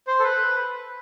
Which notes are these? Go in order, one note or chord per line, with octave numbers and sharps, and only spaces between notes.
C5
A4
B4